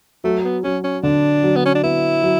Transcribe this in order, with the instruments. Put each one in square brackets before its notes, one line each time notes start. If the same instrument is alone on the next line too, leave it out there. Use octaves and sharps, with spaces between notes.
[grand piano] F#3 [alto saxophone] A3
[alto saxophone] B3
[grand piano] F#3 [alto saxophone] C#4
[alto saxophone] C#4
[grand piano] D3 [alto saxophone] D4
[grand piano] F#3
[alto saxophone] B3
C#4
D4
[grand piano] B3 [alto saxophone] E4
[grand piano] F#3